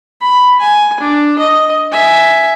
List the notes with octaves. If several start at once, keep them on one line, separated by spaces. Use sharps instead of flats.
B5
G#5
D4
D#5
E5 G#5